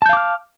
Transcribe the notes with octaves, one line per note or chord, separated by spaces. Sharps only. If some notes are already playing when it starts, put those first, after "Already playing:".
F5 A5 D6 F6 G6